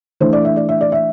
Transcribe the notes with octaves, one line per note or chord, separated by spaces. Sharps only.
E3 A3 D4 C5
D5
E5
D5
E5
D5
E5